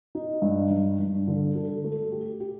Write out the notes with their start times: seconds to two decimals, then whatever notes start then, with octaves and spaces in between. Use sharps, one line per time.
0.15 D#4
0.42 G2
0.70 G2
0.99 G2
1.28 D3
1.55 A4
1.84 A3
2.12 G4
2.40 G4